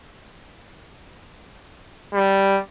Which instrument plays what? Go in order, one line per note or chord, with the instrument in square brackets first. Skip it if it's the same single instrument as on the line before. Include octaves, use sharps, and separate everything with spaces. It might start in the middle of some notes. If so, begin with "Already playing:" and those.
[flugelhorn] G3